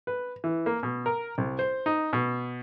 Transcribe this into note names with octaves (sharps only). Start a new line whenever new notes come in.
B4
E3
A#3
B2
A#4
C2
C5
D#4
B2